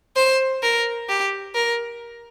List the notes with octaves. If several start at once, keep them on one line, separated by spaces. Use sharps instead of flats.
C5
A#4
G4
A#4